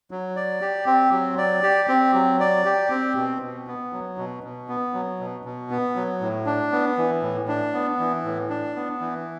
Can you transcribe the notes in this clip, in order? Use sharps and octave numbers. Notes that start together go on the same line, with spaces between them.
F#3
D5
G4
C4
F#3
D5
G4
C4
F#3
D5
G4
C4
B2
B2
B3
F#3
B2
B2
B3
F#3
B2
B2
B3
F#3
A2
D4
B3
E3
A2
D4
B3
E3
A2
D4
B3
E3